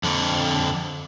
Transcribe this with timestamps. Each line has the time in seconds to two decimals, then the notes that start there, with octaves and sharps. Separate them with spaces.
0.03 F2 D3